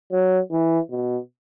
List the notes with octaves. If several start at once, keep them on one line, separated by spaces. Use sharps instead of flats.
F#3
E3
B2